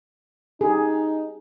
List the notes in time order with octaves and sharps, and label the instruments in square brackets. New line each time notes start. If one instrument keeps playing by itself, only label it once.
[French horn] D#4 [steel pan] G4 G#4